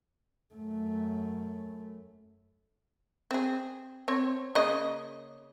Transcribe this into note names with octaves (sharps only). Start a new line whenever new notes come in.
F#2 A3
C4 G#4
C4 C#5
C#3 A#3 D#5